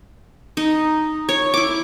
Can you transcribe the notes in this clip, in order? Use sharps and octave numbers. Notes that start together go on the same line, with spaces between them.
D#4
C#5
E4 D6